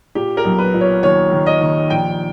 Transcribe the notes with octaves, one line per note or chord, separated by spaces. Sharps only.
A#2 G4
A#4
B1
B4
A#2
C#5
D#2 C#5
D#3
D#5
D#2
A#1 G5